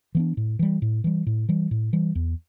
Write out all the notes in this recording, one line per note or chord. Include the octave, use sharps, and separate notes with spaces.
E3 B3 D4
A2
E3 G3
A2
E3 G3
A2
E3 G3
A2
E3 G3
E2